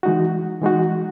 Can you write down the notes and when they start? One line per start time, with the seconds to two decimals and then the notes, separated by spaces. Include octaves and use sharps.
0.03 E3 G#3 D#4 F#4
0.61 E3 G#3 D#4 F#4